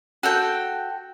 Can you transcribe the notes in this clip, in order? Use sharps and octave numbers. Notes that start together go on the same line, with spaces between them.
F#4 A4 G5